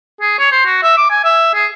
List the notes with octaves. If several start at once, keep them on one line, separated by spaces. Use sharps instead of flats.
G#4
C#5
C5
F#4
E5
D6
G#5
E5
G#4